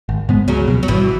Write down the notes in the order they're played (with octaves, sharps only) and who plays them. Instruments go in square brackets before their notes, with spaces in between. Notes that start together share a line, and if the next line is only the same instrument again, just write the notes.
[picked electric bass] G#1
G#2 G#3 B3
[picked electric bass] C#2 [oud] C#3 F#3
[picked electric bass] B2 F#3
[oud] F#3
[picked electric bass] G#1 [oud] B2 E3